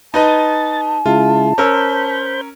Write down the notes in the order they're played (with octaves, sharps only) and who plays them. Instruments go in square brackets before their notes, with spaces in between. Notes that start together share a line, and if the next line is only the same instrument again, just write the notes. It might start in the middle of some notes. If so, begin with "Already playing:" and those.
[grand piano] D#4 B4 D#5 [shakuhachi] A5 [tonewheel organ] A6
[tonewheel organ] C#3 G#3 E4 [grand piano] F4
[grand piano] C#4 A#4 E6 [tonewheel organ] C5 B5 G6